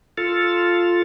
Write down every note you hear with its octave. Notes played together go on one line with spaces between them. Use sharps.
F4 A4